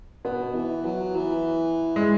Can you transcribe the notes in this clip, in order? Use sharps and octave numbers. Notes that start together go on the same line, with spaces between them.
B2 B3
E3
F#3
E3
G#3